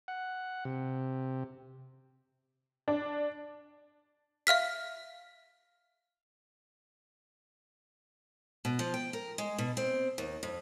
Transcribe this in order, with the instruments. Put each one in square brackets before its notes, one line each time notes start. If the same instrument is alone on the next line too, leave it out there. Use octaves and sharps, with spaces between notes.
[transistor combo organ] F#5
C3
[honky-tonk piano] D4
[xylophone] E5 F5 F6 B6
[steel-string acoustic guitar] B2
F3
G5
A#4
G#3
B2
C4
D#2
F2